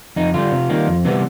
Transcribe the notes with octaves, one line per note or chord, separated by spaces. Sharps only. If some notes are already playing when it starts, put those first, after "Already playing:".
F2 D#4
D3 G3 F4
C3
D#3 G3 A#3
F2
C3 E3 G3 B3